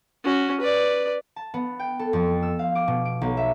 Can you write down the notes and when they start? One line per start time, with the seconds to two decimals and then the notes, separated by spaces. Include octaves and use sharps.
0.24 C#4 F#4
0.60 B4 D5
1.36 A5
1.54 B3
1.80 G5
1.99 A4
2.13 F2
2.43 E6
2.59 F5
2.75 D6
2.88 B2
3.05 D7
3.21 B1
3.37 E5